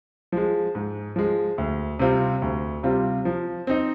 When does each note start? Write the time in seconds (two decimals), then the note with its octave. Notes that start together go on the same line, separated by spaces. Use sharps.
0.32 F3 G#3
0.75 G#2
1.16 F3 G#3
1.58 D2
1.99 C3 G3 C4 F4
2.42 D2
2.83 C3 G3 C4 F4
3.25 F3
3.67 C4 D#4